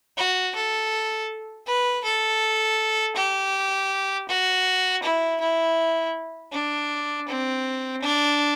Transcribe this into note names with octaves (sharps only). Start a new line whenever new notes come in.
F#4
A4
B4
A4
G4
F#4
E4
E4
D4
C4
D4